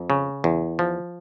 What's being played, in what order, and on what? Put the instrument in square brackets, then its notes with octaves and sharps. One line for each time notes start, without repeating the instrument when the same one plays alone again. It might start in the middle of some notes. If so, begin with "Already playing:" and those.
Already playing: [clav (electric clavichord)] F2
C#3
E2
F3